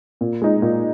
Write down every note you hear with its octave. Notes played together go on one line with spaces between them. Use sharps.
A#2
G#3 D#4
A#2